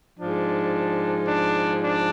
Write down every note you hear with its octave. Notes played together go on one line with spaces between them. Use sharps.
G#2 F3 D4
D4
D4